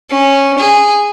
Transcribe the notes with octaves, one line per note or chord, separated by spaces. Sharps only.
C#4
G#4